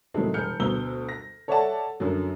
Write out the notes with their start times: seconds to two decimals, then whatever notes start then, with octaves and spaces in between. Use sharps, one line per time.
0.14 A2 C3 D#3 F#3 G#3 A3
0.34 E1 G#4 F6 G6 C#7
0.60 D2 B2 A#5 E6 G7
1.09 A#6
1.48 A4 C#5 D5 E5 F#5 A5
2.00 F#2 D3 F#3